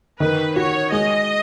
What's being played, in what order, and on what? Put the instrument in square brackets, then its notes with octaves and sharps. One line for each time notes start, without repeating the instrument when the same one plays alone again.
[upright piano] D#3 [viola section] B4
[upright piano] F#4 [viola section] C#5
[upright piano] G#3 [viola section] D#5